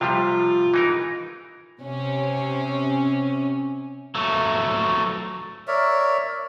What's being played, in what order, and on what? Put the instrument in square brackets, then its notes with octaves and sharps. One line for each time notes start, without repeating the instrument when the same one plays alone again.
[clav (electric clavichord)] C3 F3 G3 [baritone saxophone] F4
[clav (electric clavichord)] E3 D#4 A#4
[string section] C3 C#4
[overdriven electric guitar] F#3 A3
[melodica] A#4 C#5 D5 E5